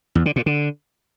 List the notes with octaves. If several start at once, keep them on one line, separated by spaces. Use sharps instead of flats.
E2
D3
A#2
D3